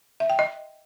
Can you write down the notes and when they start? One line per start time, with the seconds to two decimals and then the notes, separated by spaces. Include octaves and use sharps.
0.20 E5
0.30 G5
0.39 D#5